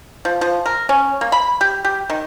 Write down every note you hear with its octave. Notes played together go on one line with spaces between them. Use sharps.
F3
F3
A#4
C#4
A#3
B5
G4
G4
D#3